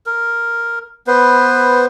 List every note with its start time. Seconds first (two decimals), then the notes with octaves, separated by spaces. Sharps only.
0.06 A#4
1.07 B3 B4 C5